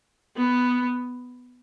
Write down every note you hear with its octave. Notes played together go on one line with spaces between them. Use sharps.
B3